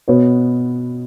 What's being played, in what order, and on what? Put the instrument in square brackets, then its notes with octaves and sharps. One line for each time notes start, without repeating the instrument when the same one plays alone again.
[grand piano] B2 B3 F#4 C#5